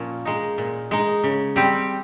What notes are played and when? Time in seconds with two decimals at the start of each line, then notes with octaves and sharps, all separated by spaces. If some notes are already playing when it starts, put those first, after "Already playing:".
Already playing: A#2 F3 C#4 F4
0.25 G#3 D#4
0.58 A#2
0.91 G#3 D#4
1.24 C#3
1.56 G3 C4 G4